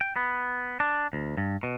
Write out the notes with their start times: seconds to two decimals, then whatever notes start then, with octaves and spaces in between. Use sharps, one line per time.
0.01 G5
0.16 B3
0.80 D4
1.13 D2
1.37 G2
1.63 B2